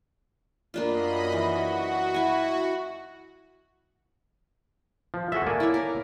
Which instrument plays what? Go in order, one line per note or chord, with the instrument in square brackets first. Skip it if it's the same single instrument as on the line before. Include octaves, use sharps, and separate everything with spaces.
[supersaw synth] F#2 D#5 B5 [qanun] A#3 D4 F4
[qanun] E3 [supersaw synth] F#4
[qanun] E4 G#5
[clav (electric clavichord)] F3
[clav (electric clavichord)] F#4 G#4 E5 [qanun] A4
[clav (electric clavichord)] A#3 D5 G#5
[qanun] E4 C#5
A#4